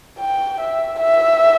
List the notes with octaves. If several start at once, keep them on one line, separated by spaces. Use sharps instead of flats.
G5
E5
E5